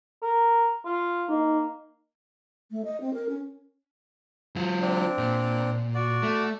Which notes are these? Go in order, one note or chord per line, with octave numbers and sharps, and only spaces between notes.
A#4
F4
A#3 D#4
A3
D#5
C4
A#4
C#4
F#3 F4
C4 D4
A#2
F#4 D5
A3